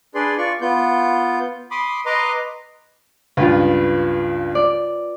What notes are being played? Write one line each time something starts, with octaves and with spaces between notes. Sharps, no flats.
D4 G#4 B4 D5 C6
F4 D5 C#6
B3 F4 G6
B5 C6 D6 D#6
B4 D#5 A#5 C6 D6
C#2 G2 F4 B4
D5